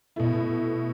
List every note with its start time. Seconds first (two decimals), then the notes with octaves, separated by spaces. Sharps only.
0.16 B2 A3 E4